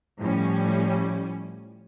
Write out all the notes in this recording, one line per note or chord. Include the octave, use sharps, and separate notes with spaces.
A2 F3 G3 C#4